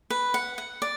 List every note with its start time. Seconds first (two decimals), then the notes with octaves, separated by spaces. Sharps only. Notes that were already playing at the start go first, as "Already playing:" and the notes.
0.10 B4
0.34 F#5
0.58 F#5
0.82 D5